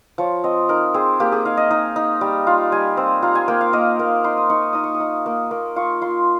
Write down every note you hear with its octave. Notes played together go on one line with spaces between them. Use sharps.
F3 C#5
C4 D#5
D#4 A#4
C4 G#4
A#3 G4
G#4
D#4 F5
D#5
D#4 D#5
D#4
G3
F4
G3 G#5
C4
F4 A#5
G#5
A#3 G5
F5
A#3 D#5
A#3
D#4 C6
D#6
D#4 C#6
D#4 D#6
C#6
D#6
D#4
A#3
A#3
F4 C#6
F4 C6